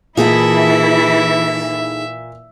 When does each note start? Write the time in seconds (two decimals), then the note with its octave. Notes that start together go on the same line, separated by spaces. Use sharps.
0.17 A#2 E3 A#3 D#4 E4 G#4 A4 E5